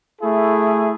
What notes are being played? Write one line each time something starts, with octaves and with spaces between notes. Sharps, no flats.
A3 E4 G#4